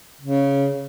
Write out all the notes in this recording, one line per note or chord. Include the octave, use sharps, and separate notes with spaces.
C#3